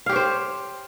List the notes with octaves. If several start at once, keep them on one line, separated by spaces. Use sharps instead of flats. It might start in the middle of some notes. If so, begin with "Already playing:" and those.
G4 C5 C#5 F5